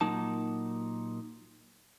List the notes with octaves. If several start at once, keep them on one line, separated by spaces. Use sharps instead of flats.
A#2 F#3 A#3 D#4 A5